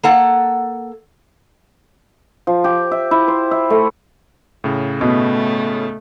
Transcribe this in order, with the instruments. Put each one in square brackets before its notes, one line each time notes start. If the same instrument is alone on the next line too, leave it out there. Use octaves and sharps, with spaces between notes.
[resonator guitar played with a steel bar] A#3 A4 F#5
[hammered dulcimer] F3
G4
E5
E4
C5
E5
A3
[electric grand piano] A2 C#3
[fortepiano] B2 [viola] A3